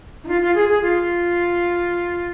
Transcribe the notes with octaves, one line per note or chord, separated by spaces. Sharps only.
D#4
F4
F4
G#4
G#4
F4